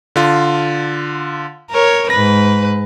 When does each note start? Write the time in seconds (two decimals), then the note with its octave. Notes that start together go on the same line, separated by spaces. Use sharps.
0.16 D3 F4
1.70 A#4 C#5
2.10 G#2 B4 A#6